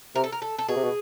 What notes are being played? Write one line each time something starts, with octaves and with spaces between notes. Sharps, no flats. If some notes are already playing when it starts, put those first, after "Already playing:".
C3 A#4
A4
A#4
A4
A4
B2 G#4
C3
B2